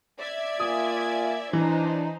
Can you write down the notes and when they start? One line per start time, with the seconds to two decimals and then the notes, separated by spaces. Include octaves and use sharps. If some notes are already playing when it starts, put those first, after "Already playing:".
0.19 D5 E5 G#6
0.60 A#3 F4 G#5 D#6
1.53 E3 D4 D#4 C5